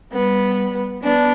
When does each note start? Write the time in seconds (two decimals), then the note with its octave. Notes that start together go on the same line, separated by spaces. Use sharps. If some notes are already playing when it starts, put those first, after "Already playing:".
0.10 G3 B3
1.02 B3 D4